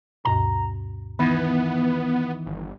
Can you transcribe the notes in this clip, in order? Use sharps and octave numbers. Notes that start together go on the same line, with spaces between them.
D2 G2 B2 A#5
D#3 E3 B3 B5
G1